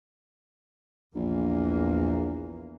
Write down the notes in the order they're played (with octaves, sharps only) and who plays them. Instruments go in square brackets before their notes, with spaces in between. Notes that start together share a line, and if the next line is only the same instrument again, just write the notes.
[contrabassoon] A#1 [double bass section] E2 E3 A#3